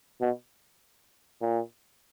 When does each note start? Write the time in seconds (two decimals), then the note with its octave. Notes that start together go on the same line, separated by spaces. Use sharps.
0.21 B2
1.41 A#2